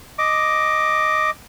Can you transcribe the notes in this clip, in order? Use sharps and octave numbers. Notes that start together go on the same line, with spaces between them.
D#5 D6